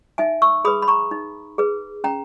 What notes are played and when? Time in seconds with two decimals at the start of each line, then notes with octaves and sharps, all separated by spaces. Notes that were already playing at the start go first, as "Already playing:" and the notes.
0.18 D#4 E5 G#5
0.42 C#6 E6
0.65 G#4 B4 B5 D#6
0.82 B5
0.88 A#5 C#6
1.11 D#4
1.58 G#4 B4
2.04 C#4 G5 A#5